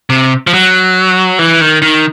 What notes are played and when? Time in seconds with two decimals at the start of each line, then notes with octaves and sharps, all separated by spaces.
0.10 C3
0.47 F3
0.54 F#3
1.39 E3
1.61 D#3
1.82 D#3